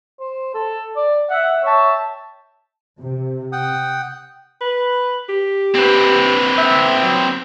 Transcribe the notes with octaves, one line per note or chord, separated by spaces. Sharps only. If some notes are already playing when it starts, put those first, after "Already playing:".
C5
A4
D5
E5 F#5
C#5 E5 G5 A5
C3
F#5 G5 D#6
B4
G4
C4 B4
E5
F#3